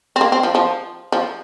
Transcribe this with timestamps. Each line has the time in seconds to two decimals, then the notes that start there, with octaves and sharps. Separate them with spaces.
0.16 C4
0.21 A#3
0.32 C4
0.43 F3
0.55 F3
1.12 F3